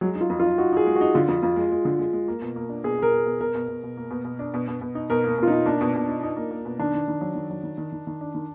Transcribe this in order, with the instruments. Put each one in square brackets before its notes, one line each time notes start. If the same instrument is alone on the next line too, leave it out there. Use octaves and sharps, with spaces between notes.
[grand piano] F#3 [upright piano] G#3
[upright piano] D#4
[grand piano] F4
[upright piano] F2
[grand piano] F4
[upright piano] D#4
[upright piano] D#4 [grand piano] F#4
[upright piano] D#4 [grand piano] G#4
[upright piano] G#3
[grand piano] F#4
[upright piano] D#4
[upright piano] D3 [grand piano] F4
[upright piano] F2
[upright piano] F2 [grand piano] F4
[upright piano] G#3
G#3
D3
G#3
G#3
A#3
B2
A#3
D4
[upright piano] B2 [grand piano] G#4
[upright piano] B2 [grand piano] A#4
[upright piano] B2
B2
[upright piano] B2 [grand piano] A#4
[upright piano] B2
B2
B2
A#3
B2
B2
D4
B2
B2
B2
D#4
[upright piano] B2 [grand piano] A#4
[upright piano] A#3 [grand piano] A#4
[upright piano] B2 [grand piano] F4
[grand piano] D#4
[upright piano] B2
[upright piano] A#3 [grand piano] D4
[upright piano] B2
B2
D#4
D#4
A#3
A#3
B2
[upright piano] D#3 [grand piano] D4
[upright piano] D#3
D#3
F#3
D#3
F#3
D#3
D#3
D#3
D#3
D4
D#3